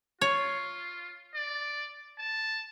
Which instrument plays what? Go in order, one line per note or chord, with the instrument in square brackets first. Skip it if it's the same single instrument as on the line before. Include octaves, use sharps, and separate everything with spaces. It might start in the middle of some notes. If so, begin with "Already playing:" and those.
[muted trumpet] F4 [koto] C#5
[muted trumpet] D5
A5